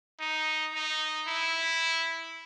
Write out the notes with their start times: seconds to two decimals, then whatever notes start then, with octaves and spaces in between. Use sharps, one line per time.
0.20 D#4
0.74 D#4
1.28 E4